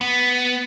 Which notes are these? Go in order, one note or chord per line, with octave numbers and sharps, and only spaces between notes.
B3